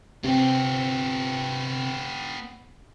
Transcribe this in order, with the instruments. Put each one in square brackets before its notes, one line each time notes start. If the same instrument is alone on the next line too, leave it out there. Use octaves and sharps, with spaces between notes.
[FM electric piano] C3 C4 [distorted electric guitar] B3 G4